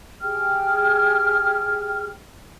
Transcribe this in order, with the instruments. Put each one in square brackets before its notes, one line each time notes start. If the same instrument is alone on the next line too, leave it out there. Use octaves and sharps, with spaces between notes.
[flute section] G4 G#4 G5 F6